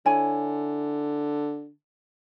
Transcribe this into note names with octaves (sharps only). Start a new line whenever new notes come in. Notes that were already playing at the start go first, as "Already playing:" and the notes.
D3 E4 C#5 G#5